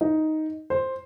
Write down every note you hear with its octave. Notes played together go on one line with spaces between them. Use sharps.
D#4
C5